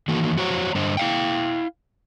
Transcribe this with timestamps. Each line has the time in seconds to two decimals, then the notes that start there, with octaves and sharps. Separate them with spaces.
0.08 D#3 E3 A#3 F#4 A4
0.37 F2 F#4 C5 C#5 A#5
0.75 G2 D3 C5 D#5
0.97 E4 F5 G5